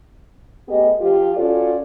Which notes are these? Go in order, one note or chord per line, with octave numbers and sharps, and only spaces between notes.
A3 B3 G4 G#4 D#5
F3 F4 G4
C#4 F4 F#4 A4 D5